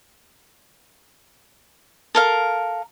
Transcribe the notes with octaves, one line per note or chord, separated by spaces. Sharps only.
A4 A#4 F5